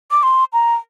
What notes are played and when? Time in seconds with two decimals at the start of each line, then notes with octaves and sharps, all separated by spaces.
0.11 D6
0.23 C6
0.53 A#5